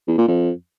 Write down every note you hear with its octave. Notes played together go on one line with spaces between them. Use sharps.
E2
A#2
F2